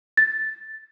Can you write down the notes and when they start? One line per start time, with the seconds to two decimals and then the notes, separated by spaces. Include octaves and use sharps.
0.17 A6